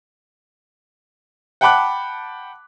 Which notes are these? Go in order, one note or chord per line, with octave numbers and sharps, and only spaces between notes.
F#5 G5 A5 B5 D6 F#6